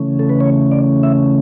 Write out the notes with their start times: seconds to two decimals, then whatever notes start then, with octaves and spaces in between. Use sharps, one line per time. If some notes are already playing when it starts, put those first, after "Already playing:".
Already playing: C#3 E3 A3 C#4
0.19 A4
0.29 B4
0.41 C#5
0.71 D5
1.03 E5